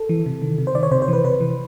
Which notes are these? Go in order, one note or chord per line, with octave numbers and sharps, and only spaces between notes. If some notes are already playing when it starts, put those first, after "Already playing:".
Already playing: A4
E3
C3
D#3
C3
C5
D#3 D5
C#5
C3 C5
C5
E3
B4
C3 B4
E3